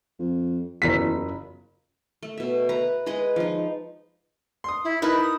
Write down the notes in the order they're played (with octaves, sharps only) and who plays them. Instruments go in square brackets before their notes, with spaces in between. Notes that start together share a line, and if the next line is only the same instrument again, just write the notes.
[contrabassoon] F2
[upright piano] F#1 F4 B6 [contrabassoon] E2
[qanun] A3
B2 E5
B4 A#5
G#3 G#4 B4 D#5
F3 D#4
[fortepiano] C6 D#6
[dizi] E4
[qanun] D#4 E4 A5 [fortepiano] A#4 B5 [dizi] B4
[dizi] D#6